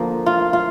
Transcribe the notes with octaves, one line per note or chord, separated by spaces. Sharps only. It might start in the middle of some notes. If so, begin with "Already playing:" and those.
Already playing: D3 F3 A#3 D4
F4
F4